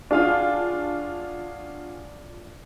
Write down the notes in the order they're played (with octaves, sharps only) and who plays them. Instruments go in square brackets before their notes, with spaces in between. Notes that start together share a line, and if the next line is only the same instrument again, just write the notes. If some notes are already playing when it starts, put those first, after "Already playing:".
[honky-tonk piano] D4 F4 [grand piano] F#4 G#4 F5